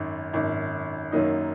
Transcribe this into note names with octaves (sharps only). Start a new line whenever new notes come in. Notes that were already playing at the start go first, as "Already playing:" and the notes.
Already playing: G#1 F#2 D#3
G#1 F#2 D#3
F#2 D#3 F#3 A#3 D#4